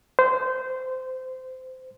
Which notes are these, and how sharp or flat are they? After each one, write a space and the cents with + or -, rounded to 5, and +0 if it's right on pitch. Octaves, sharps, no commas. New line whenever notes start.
C5 -20